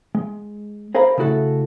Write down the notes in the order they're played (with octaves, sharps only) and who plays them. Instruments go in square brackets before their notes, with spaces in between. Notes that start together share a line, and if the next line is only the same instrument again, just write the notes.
[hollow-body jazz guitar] G#3
G#4 A#4 C5 F5 A#5 B5
C#3 A3 E4 F#4 A4